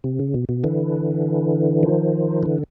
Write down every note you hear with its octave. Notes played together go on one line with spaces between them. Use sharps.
C3
C#3
B2
B2
D3 E3
D#3 F3
D3 E3